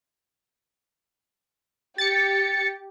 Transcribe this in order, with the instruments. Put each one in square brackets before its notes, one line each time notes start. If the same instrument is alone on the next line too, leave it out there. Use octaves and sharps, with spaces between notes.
[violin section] G4 [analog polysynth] A6 C#7